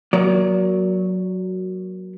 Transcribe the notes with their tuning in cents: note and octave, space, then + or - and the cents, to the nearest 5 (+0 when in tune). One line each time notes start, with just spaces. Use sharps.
F#3 +0 A#3 +25 D5 -30